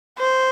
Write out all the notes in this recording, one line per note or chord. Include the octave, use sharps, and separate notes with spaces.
C5